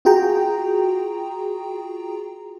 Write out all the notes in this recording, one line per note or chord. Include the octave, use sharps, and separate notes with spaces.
F4 F#4 G#4 G5 A#5